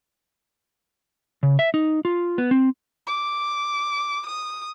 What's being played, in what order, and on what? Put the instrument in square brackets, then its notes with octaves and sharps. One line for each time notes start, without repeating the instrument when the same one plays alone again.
[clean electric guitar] C#3
E5
D#4
F4
B3
C4
[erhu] D6
D#6